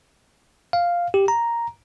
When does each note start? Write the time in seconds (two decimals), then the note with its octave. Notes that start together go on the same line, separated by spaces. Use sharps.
0.73 F5
1.14 G4
1.28 A#5